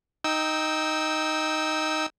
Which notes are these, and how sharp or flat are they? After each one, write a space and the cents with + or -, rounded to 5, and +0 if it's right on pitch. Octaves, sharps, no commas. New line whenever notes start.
D#4 +0 G5 +0 E6 -25